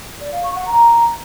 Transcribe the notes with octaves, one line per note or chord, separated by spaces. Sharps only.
D5
F5
C#6
F#5
A#5